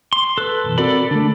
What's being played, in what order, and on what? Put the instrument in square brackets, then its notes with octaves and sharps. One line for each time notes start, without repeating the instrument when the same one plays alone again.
[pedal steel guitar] C6
[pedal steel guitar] A4 B4 [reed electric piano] F#6
[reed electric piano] F#2 B2 E3
[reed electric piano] C4 F#4 A#4 [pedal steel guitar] A4 D5 B5
[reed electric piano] D3 A3 [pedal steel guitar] D4